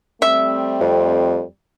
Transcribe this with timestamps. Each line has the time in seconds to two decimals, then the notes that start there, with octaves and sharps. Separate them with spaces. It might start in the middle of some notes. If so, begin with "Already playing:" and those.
0.22 G3 A3 C4 E5
0.81 F2